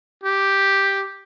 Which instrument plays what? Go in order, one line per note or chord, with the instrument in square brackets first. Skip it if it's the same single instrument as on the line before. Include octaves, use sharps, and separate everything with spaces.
[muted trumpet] G4